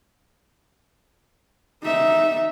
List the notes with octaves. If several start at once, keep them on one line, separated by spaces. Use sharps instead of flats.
D#4 E5